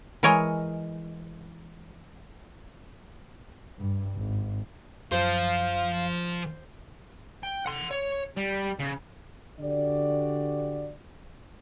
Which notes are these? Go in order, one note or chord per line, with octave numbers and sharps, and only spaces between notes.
E3 G#3 A#4 C#5 D#5
G2
G#1
F#2 F3 C5 F5
G5
F#5 C6
C#5
G3
C#3
D3 F#4 G4 D5